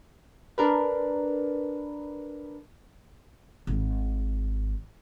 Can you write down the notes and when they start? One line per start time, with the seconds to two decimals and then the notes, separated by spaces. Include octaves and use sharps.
0.58 D4 A#4 B4
3.67 G#1